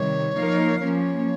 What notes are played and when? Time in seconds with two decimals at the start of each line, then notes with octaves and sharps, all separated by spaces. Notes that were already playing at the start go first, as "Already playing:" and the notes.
Already playing: C3 D#3 G3 C#5
0.36 F3 A#3 D#4 A#4 F5
0.80 F3 A#3 C#4 C#5